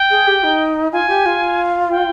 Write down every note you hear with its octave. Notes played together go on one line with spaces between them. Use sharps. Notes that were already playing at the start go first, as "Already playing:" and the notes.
Already playing: G5
G#4
G4
D#4
F4 G#5
G4
F4
G5